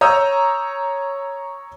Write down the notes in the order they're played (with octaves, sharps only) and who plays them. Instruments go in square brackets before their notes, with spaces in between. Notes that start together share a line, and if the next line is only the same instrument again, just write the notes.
[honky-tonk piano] C#5 A#5 D#6 E6 G6